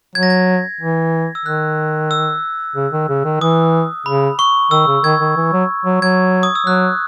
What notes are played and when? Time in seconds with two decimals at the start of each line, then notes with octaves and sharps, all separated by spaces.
0.15 F#3 G#6
0.23 A#6
0.30 G#6
0.81 E3
1.35 E6
1.46 D#3 F#6
2.11 E6
2.76 C#3
2.93 D#3
3.09 C#3
3.25 D#3
3.41 E3 D#6
4.06 C#3 B5
4.39 C#6
4.71 D#3 E6
4.87 C#3
5.03 D#3 G#6
5.21 D#3
5.36 E3
5.53 F#3
5.85 F#3
6.01 F#3 G#6
6.43 D#6
6.55 E6
6.66 F#3 F#6